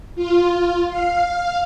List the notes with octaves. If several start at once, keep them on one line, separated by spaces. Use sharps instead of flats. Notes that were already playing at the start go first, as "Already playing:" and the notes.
F4
F5